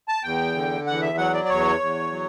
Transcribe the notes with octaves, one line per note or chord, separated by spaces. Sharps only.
A5
E2 G5
D3
E2 F#5
E5
F#3 F#5
D5
D5
E2 C#5
E2
F#3